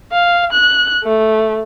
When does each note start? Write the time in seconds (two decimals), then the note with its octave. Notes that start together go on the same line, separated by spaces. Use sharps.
0.12 F5
0.53 F#6
1.04 A3